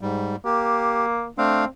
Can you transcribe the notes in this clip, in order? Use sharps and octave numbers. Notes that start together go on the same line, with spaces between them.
G#2 G3
A#3 G4
A3 C4 D4 F5